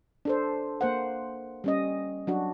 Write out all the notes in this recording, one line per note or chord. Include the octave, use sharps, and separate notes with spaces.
D4 A4 C5
A#3 C5 F#5
G3 C#4 D#5
F#3 D4 F#4